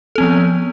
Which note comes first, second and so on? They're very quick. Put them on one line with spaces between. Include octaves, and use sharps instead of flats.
A4 C4 F3 B3